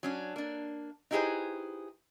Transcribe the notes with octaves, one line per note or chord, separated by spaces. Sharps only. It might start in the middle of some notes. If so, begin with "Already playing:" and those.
F#3 C#4 D4
A#3 D4
D#4 E4 G4 G#4 B4 C5